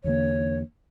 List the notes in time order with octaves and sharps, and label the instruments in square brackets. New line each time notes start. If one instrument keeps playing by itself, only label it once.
[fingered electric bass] E2 D3 A#3 [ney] C#5